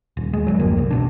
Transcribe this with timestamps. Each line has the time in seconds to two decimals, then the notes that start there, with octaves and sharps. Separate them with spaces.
0.17 D#1
0.33 G#3
0.47 G#1 D2 F#3
0.59 F2 A#3
0.77 F#1 C2
0.91 E1 B2 D4